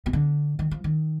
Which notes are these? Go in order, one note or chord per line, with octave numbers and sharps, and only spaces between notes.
B2
D3
D#3
F3
D#3